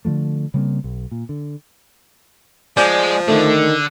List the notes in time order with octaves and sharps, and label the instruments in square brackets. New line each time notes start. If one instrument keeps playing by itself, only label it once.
[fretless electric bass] D3 D#3 F3 A3
C#3 G3 A#3 C4
B1
A#2
D3
[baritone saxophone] F3 [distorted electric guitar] G#3 [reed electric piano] D5 G#5 G6
[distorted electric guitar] D3 [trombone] D#3 [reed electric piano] A3